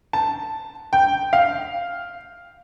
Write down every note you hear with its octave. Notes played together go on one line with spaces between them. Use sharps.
A5
G5
F5